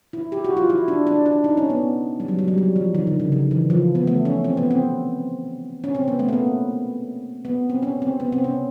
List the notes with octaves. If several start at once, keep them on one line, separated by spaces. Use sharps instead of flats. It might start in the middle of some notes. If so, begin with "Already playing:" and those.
E4
G4
F#4
F4
E4
D4
D4
D4
D#4
C#4
B3
G3
F#3
F#3
G3
F#3
F3
D#3
D3
C#3
D#3
E3
F3
B3
A3
C#4
C4
B3
C4
C#4
C4
B3
A3
B3
A#3
B3
C4
C#4
C4
B3
C4
C#4